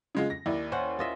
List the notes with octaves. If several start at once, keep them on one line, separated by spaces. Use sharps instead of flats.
C#3 G#3 F4
A#6
D#2 E4 D5
C#4 C5 F#5
F4 D#5 E5